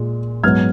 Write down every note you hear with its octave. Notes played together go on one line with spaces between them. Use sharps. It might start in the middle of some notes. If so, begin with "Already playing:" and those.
Already playing: A#2 G#3
G#2 F#3 B3 F6 G#6